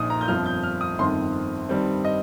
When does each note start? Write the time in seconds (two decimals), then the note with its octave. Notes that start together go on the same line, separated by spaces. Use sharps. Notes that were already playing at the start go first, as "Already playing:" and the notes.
Already playing: A#1 A#2 F3 D#4 D#6
0.10 A#5
0.21 G6
0.28 G1 F2 F3 F6
0.46 G6
0.63 F6
0.81 D#6
0.98 G1 F2 D#3 C4 C6
1.69 G2 D#3 G3 C4
2.05 D#5